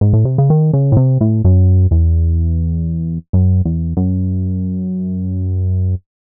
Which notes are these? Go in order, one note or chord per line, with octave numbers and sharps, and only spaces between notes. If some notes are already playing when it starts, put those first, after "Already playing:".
G#2
A2
C3
C#3
D#3
C#3
A2
C3
A2
F#2
E2
F#2
E2
F#2